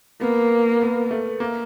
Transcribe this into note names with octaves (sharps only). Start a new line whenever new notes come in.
A#3 B3
B3
A3
A#3